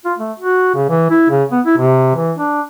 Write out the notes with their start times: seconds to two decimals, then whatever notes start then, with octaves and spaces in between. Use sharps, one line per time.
0.05 F4
0.18 A3
0.40 F#4
0.75 C#3
0.89 E3
1.10 E4
1.30 C#3
1.52 B3
1.66 E4
1.78 C3
2.15 E3
2.38 D4